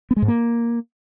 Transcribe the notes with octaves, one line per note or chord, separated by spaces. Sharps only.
B3
G#3
G#2
A#3